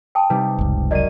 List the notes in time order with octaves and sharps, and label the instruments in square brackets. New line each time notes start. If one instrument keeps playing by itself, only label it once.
[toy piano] G5 A5 D#6
[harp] C3 G3 D#4 [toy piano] B4
[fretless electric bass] F#1 C#2
[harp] F#2 C7 D#7 [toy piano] D5 D#5